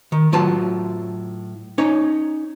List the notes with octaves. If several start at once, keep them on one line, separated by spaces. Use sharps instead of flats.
D#3
A2 F#3 F4 B4 A5
C#4 D#4 C#5